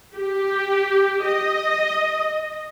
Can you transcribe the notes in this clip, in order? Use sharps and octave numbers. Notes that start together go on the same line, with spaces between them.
G4
D#5